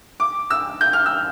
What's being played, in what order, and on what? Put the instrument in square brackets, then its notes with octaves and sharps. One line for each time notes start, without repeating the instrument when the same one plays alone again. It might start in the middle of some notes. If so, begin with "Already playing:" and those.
[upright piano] D6
E6
G6
F6
E6